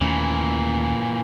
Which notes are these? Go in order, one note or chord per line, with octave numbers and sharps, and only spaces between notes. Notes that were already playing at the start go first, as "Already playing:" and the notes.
D#2 A#2 E3 A3 C#4